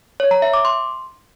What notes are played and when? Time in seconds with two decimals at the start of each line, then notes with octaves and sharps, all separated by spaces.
0.20 C#5
0.31 A#5
0.42 E5
0.54 D6
0.65 C6